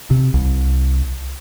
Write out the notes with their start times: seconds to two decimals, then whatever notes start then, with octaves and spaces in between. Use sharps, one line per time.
0.11 C3
0.34 C2